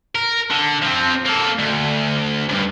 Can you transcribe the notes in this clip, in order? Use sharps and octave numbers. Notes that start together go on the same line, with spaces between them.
A#4
D3
F3 C4
A#3 A4
D2
C#2 G2